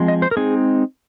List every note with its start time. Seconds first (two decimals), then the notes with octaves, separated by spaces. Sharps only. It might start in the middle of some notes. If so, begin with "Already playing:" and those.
Already playing: F3 G#3 C4
0.08 D#5
0.22 C5
0.31 A#4
0.37 G#3 C4 D#4 G#4